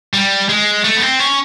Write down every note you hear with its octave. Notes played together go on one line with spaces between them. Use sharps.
G3
G#3
A3
B3
C4
C#4